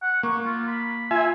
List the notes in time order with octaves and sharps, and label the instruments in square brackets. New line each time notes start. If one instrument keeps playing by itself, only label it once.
[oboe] F#5
[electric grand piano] A#3 [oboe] C#6
[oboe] F4
B5
[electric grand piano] F4 [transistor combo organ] E5 G#5